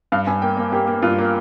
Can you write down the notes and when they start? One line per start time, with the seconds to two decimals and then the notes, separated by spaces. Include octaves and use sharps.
0.12 G2 F5
0.27 G2 G#5
0.42 A#3 G5
0.57 A#3
0.72 A#3 G4
0.87 A#3
1.02 G2 F4
1.18 A#3